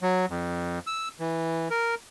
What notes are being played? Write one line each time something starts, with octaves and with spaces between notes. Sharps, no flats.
F#3
F2
E6
E3
A#4